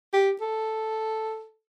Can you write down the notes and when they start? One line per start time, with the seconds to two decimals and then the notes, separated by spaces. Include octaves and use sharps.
0.13 G4
0.41 A4